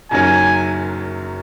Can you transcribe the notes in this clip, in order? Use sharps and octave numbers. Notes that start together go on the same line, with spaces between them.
F#1 F#2 D#3 F#3 C#4 G#5